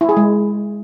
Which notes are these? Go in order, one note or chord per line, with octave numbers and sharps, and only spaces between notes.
E4
G#4
G#3